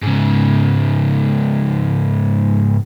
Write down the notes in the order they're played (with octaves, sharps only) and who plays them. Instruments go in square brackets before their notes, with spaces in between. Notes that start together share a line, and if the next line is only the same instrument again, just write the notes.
[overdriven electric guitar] G#2 C#3